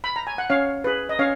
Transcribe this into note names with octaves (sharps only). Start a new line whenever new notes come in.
B5
A#5
G#5
F#5
C#4 C#5 F5
G#4 B4
D#5
C#4 C#5 F5